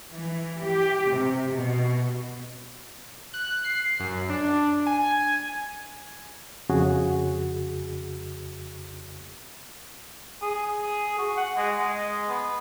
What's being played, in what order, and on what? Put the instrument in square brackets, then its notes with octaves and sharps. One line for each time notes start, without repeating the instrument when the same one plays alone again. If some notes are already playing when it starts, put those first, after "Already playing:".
[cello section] E3
G4
C3
B2
[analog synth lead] F#6
C7
F#2
D4
G#5
[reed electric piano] F2 C#3 F#4 G#4
[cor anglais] G#4
F#4
F#5
G#3
G#3
B3